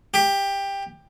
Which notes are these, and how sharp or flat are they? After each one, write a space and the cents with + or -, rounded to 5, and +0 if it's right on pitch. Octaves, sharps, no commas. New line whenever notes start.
G4 +15